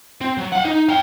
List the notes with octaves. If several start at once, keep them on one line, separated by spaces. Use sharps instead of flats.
C4
F#3
F5 F#5
D#4
F5 G5